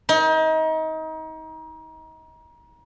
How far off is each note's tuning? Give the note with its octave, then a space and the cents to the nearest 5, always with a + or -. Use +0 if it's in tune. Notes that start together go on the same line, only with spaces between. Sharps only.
D#4 +30